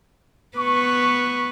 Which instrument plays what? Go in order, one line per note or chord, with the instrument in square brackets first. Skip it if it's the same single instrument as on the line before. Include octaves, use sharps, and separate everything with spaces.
[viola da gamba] B3 B4 [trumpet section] C#6